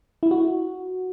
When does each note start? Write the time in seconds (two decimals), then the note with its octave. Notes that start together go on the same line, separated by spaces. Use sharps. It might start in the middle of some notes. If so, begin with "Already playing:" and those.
0.23 E4
0.31 F#4